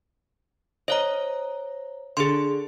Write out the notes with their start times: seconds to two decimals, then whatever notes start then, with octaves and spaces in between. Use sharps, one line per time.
0.88 C5 C#5 D#5 A#5
2.17 D3 G#4 C6